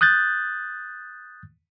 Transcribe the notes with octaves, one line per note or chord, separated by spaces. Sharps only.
D#6 F#6 G6 A6